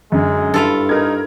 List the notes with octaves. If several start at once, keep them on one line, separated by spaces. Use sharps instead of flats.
F#2 D3 G#3
G2 E4 F4 A4
D#4 A#4 G#6